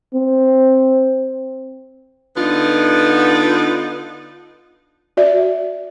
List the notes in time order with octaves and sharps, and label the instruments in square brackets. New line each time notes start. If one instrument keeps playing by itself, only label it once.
[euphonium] C4
[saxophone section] D3 B3 D#4 F4
[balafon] F#4 D5 E5